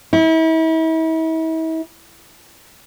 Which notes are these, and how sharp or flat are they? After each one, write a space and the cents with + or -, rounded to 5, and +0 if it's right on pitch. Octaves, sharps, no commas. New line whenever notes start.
E4 -40